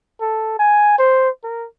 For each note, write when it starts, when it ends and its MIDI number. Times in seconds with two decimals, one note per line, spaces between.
0.21 0.54 69
0.59 0.95 80
0.99 1.29 72
1.44 1.67 70